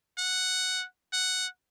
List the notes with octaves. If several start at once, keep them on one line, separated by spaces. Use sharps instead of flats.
F#5
F#5